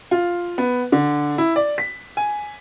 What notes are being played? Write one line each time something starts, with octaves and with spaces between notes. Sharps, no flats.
F4
B3
D3
E4
D5
B6
G#5